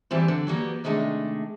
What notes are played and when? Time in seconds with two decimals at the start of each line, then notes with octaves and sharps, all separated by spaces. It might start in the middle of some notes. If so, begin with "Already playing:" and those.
0.11 E3 G3 A3 B3 C4
0.28 D3
0.47 F#3 G3 A#3 B3
0.84 C3 D#3 G#3 A3 D4